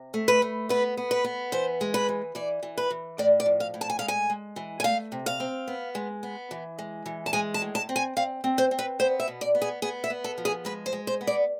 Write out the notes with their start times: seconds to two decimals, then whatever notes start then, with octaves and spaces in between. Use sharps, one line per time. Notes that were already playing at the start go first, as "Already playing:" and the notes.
Already playing: C3
0.14 A3
0.28 B4
0.42 A3
0.69 B3 B4
0.97 B3
1.11 B4
1.24 B3
1.52 E3 C5
1.81 G#3
1.94 B4
2.09 E3
2.35 E3 D5
2.63 E3
2.78 B4
2.90 E3
3.18 A2 D5
3.40 D5
3.46 F3
3.60 F5
3.74 A2
3.81 A5
3.90 G#5
3.99 G#3 F5
4.08 G#5
4.30 G#3
4.56 E3
4.80 G#5
4.84 A3 F5
5.12 C3
5.26 F5
5.40 C4
5.68 B3
5.95 G#3
6.23 B3
6.51 E3
6.79 G#3
7.06 E3
7.26 A5
7.33 G#3 G#5
7.54 A5
7.62 A2
7.75 A5
7.89 C4
7.96 G#5
8.17 C4 F5
8.44 C4
8.58 C5
8.71 C4
8.79 B4
9.00 B3 C5
9.20 E5
9.28 B2
9.41 D5
9.55 B3
9.62 G#4
9.82 B3 G#4
10.04 E5
10.10 B3
10.24 A4
10.38 F3
10.45 G#4
10.65 G#3 B4
10.86 C5
10.93 G#3
11.07 C5
11.21 B3
11.27 D5